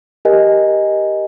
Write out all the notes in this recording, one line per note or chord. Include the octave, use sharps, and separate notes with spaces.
G4 A#4 D#5 G#5